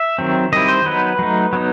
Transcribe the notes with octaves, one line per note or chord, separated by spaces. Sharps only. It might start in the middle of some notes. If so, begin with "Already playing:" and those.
Already playing: E5
D#3 F#3 C4
D#3 G3 C4 E4 D#5
C5
F#3 B3 D#4 B4
F#3 A3 D#4
F#3 B3 D#4